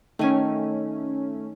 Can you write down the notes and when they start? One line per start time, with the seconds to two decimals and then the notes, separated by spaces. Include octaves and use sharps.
0.19 D#3 A3 C#4 G#5